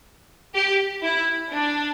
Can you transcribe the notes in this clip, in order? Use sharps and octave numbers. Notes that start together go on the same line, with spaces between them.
G4
E4
D4